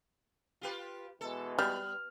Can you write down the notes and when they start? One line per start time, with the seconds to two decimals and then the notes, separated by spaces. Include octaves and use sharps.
0.61 F4 G4 B4
1.21 B2 E3 G#3 A4
1.59 G3 B3 F6